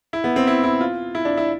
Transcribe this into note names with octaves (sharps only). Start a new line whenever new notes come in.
E4
B3
C4
E4
E4
F4
E4
D4
E4